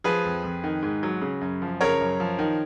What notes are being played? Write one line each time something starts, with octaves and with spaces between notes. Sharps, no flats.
F3 G#4 B4
F2
F2
D#3
G#2
F#3
C#3
F#2
F3
C#3 A#4 C#5
F#2
F3
D#3